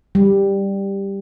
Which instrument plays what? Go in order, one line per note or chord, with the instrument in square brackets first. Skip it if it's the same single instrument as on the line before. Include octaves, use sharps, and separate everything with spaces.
[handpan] G3